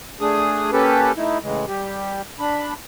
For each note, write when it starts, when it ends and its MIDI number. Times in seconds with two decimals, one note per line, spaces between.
0.21 0.71 57
0.21 0.71 62
0.21 0.71 68
0.21 0.71 87
0.72 1.12 58
0.72 1.12 61
0.72 1.12 67
0.72 1.12 69
0.72 1.12 71
1.17 1.38 57
1.17 1.38 63
1.17 1.38 64
1.43 1.65 45
1.43 1.65 49
1.43 1.65 52
1.43 1.65 56
1.68 2.22 55
1.68 2.22 67
2.39 2.74 62
2.39 2.74 83